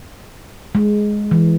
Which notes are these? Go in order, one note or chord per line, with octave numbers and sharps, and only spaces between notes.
G#3
E3